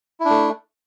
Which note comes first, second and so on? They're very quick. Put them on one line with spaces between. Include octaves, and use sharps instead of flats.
E4 D4 A3